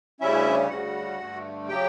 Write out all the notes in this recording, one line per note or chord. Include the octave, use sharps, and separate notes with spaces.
D2 C#3 G3 C#4 E4 E5
D2 C#3 G3 F#4 F#5
G2 D3 A3
C#3 F#3 G4 G5